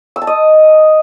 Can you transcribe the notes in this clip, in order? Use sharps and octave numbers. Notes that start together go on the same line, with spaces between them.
E6
A5
D#5